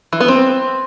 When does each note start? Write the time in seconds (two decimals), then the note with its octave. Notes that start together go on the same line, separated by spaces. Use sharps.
0.13 E3
0.20 B3
0.28 C4